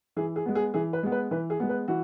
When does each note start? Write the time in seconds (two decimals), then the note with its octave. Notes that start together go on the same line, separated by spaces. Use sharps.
0.16 E3 G#4
0.36 G#4
0.46 G#3 B3
0.55 G#4
0.74 E3 G#4
0.93 B4
1.03 G#3 B3
1.12 B4
1.31 E3 B4
1.50 G#4
1.60 G#3 B3
1.69 B4
1.88 E3 F#4